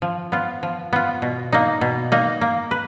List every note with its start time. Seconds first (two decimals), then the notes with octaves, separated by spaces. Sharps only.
0.02 F3
0.32 B3 F4
0.63 F3
0.93 B3 F4
1.22 B2
1.52 A#3 D#4
1.81 B2
2.12 A#3 D#4
2.41 A#3
2.71 B4